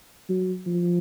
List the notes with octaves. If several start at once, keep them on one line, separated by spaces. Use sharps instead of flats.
F#3
F3